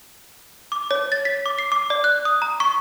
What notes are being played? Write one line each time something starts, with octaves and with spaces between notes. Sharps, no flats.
D6
C#5
A6
B6
D6
C7
D6
D5
F#6
D#6
A#5
C#6